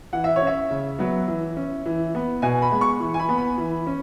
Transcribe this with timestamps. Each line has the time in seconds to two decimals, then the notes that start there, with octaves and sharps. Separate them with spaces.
0.13 E3 F#5
0.24 E5
0.36 C#5
0.42 C#4 E5
0.71 C#3
0.99 F#3 B3
1.28 E3
1.57 C#4
1.86 E3
2.15 B3
2.42 B2 G#5
2.62 B5
2.71 G#3 B3
2.81 C#6
3.00 E3
3.14 G#5
3.20 B5
3.29 B3
3.38 B5
3.58 E3
3.87 C#4